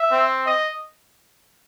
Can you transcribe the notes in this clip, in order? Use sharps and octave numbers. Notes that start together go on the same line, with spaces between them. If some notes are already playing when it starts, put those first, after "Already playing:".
Already playing: E5
C4
D#5